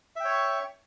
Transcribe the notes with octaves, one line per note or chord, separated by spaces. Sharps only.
C#5 E5 G5 C#6